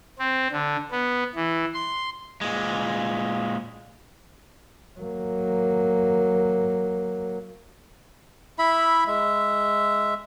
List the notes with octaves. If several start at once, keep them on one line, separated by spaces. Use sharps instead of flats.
C4
D3
B3
E3
C6
A#2 G#3
F#3 A#3
E4 E5 B5
G#3 E5